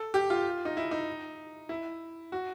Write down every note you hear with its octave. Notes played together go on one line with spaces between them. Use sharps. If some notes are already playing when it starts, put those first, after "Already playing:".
Already playing: A4
G4
F4
D#4
E4
D#4
E4
F#4